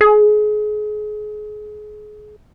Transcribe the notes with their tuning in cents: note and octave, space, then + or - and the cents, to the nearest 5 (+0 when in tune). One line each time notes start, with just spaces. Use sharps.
G#4 +30